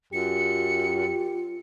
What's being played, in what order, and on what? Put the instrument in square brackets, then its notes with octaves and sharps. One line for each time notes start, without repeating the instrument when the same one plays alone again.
[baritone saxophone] F#2 [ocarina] F4 [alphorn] G4 [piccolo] C#7